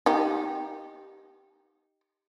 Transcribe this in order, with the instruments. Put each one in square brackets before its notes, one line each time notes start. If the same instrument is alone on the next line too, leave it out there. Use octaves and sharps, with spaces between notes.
[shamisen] D#4 G4